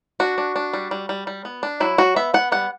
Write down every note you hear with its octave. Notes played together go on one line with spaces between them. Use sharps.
D4 F#4
D4
D4
G3
G3
G3
G3
B3
D4
F#3 E4
F#3 F#4
B3 E5
B3 F#5
G3 F#5